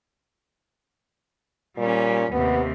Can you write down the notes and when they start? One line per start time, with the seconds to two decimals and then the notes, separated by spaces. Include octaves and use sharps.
1.78 A#2 G3 C#4
2.32 D#2 C3 B3